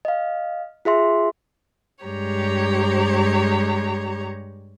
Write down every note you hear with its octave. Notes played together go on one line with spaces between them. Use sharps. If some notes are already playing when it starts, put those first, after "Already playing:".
D#5 F5
F4 G#4 E5 C6
G2 G#3 G4 C#5 A#5